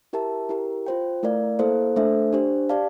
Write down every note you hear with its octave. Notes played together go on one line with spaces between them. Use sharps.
E4 G4 A#4 E5 A5
E4 G4 A#4
F4 C5 G5
A3 E4 A#4 D5 F5
A#3 E4 A4 C5 F5
A3 D4 A4 C5 E5
D4 G4 C5
G4 D5 F5 A5